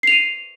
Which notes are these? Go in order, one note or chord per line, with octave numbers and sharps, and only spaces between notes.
C7 D#7 F7